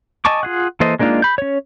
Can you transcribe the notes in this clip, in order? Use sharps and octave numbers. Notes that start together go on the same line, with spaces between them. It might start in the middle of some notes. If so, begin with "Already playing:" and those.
D#5 G#5 A5 C#6 D6
F4 G#4 F#5
E3 A#3 A4 C5 D#5
G#3 A#3 D4 D#4 F4
B5 G6
C#4 C#5